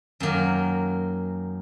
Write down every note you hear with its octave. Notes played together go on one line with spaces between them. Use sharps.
F#2 D#3 F#3 A#3